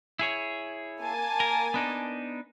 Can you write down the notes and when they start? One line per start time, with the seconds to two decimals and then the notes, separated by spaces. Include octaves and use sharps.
0.19 E4 G#4 C#5
1.00 A#3 G#5 A5
1.40 A#4
1.74 B3 D4 D#4